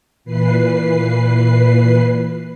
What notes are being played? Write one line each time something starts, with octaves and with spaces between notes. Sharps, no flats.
A#2 E3 B4 C7